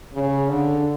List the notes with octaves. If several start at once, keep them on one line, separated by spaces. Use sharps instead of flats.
C#3
D3